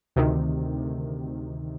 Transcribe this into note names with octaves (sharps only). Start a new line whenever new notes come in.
D2 C3 D#3